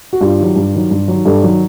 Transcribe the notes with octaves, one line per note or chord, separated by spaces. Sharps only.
F#4
G2 F4 G4
D#3 F#3
G2
D#3 F#3
G2
D#3 F#3
G2 G4 A4
D#3 F#3